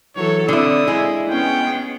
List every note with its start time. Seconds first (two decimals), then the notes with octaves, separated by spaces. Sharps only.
0.16 E3 F#3 A4 C#5
0.48 D3 C4 E4 D5 D#6
0.88 G#3 E4
1.30 B3 C#4 G5